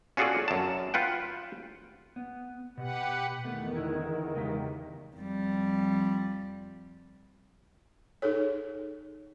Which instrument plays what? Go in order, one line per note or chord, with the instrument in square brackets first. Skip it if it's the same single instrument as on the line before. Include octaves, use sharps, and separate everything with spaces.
[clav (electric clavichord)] C#4 F4 F#4 G#4 A4 D5
F#2 A5
F4 B4 F#5 G5
[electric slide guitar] B3
[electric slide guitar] B2 [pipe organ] G4 B4 F#5
[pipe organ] E2 D#3 [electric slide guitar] A3 B3
[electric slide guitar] D3 E4
C#3 G#3 G4
[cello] F2 G3
[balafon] D#4 G#4 A4 C#5